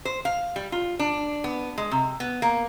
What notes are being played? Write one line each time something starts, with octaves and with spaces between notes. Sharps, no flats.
C5
F5
G3
F4
D4
B3
G#3
C3
B3
A#3